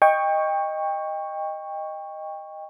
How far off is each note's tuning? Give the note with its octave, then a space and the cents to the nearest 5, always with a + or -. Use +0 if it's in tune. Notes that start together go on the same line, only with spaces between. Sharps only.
D#5 +0 G5 +25 C#6 +0